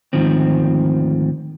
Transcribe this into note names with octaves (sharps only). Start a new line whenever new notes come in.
D2 G#2 D#3 F3 C4